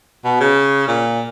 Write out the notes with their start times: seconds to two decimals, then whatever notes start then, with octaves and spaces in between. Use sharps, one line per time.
0.24 B2
0.40 C#3
0.87 A#2